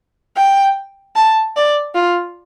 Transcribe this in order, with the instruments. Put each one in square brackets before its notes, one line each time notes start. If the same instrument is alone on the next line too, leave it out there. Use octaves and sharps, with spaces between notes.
[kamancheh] G5
A5
D5
F4